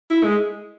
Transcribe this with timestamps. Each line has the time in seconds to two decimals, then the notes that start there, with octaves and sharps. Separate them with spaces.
0.10 E4
0.24 G#3